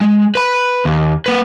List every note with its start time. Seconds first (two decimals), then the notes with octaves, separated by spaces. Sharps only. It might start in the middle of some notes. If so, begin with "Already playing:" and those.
0.01 G#3
0.35 B4 B5
0.85 D#2
1.26 A#3 B4